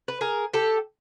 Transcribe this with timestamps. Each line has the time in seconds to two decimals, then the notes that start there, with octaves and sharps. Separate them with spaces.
0.08 B4
0.21 G#4 A#4
0.54 G4 A4